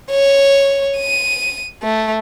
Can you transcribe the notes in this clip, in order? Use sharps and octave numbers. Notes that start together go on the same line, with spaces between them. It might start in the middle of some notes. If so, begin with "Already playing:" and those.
C#5
D#7
A3